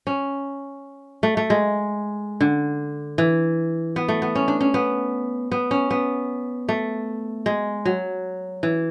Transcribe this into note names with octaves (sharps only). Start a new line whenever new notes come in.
C#4
A3
A3
G#3
D3
E3
B3
A3
B3
C#4
D4
C#4
B3
B3
C#4
B3
A3
G#3
F#3
E3